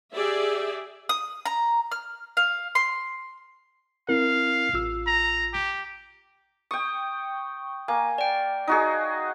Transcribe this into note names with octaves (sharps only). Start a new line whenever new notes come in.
G4 G#4 D5 E5
D#6
A#5
F6
F5
C6
C4 E4 A#4 F5
A1 F4 E6
A#5
G4
G5 C#6 D#6
A#3 G#5
D5 G5
D#4 F#4 G#4